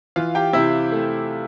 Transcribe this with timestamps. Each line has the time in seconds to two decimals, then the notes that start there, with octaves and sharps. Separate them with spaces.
0.16 E3 F4 F5
0.35 G4 G5
0.53 C3 E4 E5
0.92 A3